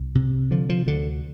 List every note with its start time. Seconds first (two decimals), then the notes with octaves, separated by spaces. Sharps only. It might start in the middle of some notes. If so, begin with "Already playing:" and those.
Already playing: C2
0.15 C3
0.51 D3 F3
0.69 F3
0.87 D2 D3